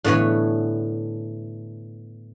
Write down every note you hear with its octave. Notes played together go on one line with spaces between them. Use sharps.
A2 D3 E3 B3 C#5